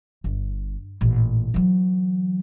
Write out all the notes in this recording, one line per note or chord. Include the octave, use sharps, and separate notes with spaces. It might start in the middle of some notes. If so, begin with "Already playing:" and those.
G1
A1 A#2
E3 F#3